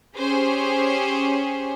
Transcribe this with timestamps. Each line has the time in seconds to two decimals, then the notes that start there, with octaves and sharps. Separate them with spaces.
0.19 C#4 G4 G#4 C5